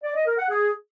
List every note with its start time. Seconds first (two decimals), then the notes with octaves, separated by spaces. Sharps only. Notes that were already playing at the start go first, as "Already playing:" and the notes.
0.04 D5
0.15 D#5
0.27 A#4
0.38 F#5
0.49 G#4